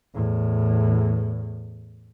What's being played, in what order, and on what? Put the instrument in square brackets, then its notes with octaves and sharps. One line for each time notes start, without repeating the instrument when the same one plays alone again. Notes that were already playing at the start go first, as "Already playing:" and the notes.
[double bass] E2 A2